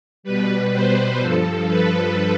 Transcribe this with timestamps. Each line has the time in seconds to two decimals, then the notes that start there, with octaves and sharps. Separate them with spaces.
0.23 B2 G3 B4
0.72 C5
1.19 G2 F3 A4
1.67 B4